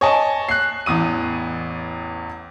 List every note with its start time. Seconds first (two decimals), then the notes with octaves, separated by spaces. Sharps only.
0.01 C#5 D#5 G#5 A5
0.49 F#6 C7
0.86 A1 E2 D#6 D#7